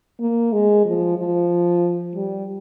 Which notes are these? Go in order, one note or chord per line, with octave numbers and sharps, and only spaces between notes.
A#3
G#3
F3
F3
G3